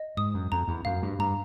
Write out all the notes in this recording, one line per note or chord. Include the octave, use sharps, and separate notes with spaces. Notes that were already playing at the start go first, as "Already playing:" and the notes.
Already playing: D#5
G#2 D#6
F#2
F2 A#5
E2
F#2 F5
G2
G2 A#5